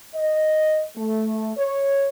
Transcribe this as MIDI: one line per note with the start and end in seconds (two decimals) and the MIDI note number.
0.15 0.83 75
0.96 1.52 57
1.57 2.08 73